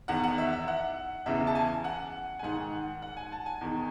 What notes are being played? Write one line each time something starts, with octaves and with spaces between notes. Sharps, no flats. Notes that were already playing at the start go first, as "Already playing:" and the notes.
E2 D#3 F#5
F#5
E5
E5
F#5
E2 C#3 E3 E5
A5
G#5
F#5
G#5
G#2 D#3 F#5
F#5
G#5
A5
G#5
E2 D#3